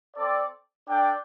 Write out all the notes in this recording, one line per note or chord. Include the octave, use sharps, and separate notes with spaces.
C4 A4 D5
D4 A4 D5 G5